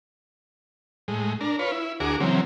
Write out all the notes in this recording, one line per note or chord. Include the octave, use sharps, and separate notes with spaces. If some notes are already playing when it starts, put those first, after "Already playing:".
A2 G#3
D4 A#4
F4 B4 C#5
E4
D2 F#4 G#4 A#4 D6
C#3 E3 F#3 A#3 C4